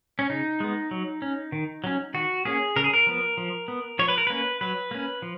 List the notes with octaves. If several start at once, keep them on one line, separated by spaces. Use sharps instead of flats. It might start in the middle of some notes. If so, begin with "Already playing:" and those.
C#4
C#3 D#4
G#3 B3
F#3
C#4
D#3
F#3 C#4
D#3 F#4
A#3 C#4 G#4
C#3 A#4
G#4
A#4
F3 B3
F3
B3
F3 C#5
B4
A#4
A#3 C#4 B4
F#3 B4
A#3 C#4
F3